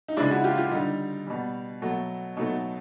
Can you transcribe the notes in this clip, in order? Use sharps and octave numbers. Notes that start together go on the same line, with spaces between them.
D#4
C#3 F3 G#3 D4 E4
E4 F#4
F4 G4
F4 G4
D3 G3 D#4
B2 G3
B2 F#3 A3
B2 F#3 A3 D#4